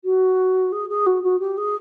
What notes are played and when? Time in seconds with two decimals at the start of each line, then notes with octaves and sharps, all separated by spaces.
0.04 F#4
0.72 G#4
0.89 G#4
1.06 F#4
1.23 F#4
1.39 G4
1.57 G#4